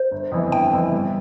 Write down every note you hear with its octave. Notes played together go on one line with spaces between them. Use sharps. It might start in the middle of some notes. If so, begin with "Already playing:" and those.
Already playing: C5
G1
F2 E3 B3 E4
G1 G5
F2 E3 B3 E4
G2